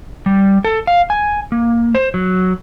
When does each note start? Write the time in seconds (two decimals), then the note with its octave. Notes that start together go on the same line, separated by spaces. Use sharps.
0.26 G3
0.65 A4
0.87 F5
1.10 G#5
1.52 A#3
1.95 C5
2.14 F#3